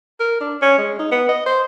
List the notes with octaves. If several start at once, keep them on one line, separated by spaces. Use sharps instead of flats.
A#4
D4
C#4
G#3
D#4
B3
D#5
C5